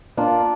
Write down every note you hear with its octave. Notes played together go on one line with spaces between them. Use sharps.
A#3 D4 F4